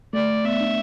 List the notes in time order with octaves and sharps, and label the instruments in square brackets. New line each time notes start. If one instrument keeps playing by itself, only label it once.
[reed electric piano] A3 [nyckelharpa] D5
[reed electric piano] B3 [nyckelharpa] E5
[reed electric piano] D4